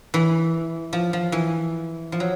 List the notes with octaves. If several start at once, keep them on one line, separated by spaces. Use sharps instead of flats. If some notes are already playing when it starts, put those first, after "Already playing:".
E3
F3
F3
E3
F3
F#3